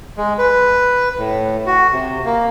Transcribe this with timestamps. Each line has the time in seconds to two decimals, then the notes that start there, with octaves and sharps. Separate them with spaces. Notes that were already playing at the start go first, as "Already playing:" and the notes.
0.17 G#3
0.39 B4
1.18 A2
1.66 F#4
1.92 C3
2.25 A#3